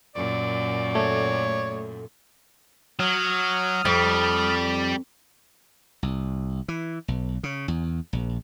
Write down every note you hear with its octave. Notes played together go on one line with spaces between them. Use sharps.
F#2 A#2 D5
A3 C#5
F#3 D#6 F6
F2 G3
C2
E3
B1
C#3
E2
A#1